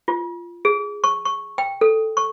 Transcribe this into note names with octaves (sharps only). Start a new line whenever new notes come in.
F4
G#4
C#6
C#6
G5
A4
C#6